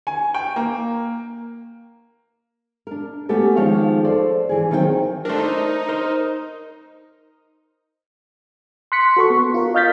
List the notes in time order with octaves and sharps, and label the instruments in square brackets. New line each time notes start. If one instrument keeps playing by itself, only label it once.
[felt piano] G#5
G5
A#3
[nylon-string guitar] D4 A#4
A3 B3 C#4 F#4 G4 A4
D#3 F3 G#3 C#5 F5
A4 C5 D5
E3 G#4
D#3 F#3 C4 D#5 G5
[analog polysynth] A3 D4 [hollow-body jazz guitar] A#4 C5
[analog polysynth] D#4
[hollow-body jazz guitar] A#4 C5
[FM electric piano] C6 F#6 B6 C#7
F#4 A4 C#6
B3
F4 A#4
D#5 F5 F6 G6 A6 B6